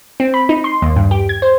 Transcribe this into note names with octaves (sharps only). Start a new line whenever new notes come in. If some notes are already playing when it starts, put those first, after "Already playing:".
C4
B5
D#4
C6
D#2
G2
G4
G#6
C5